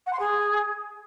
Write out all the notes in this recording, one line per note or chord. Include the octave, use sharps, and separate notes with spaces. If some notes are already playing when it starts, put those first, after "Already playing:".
F#5
C6
G#4